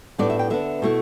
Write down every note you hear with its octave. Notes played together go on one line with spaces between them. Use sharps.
A2 G3 B3 D4 D5
E5
G5
D3 B3 D4 E5
B2 A3 E4